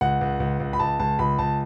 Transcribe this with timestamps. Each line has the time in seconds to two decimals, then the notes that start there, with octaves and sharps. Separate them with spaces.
0.01 C#2 F#5
0.21 C#2
0.40 C#2
0.60 C#2
0.73 B5
0.79 C#2 A5
0.99 C#2 A5
1.19 C#2 B5
1.39 C#2 A5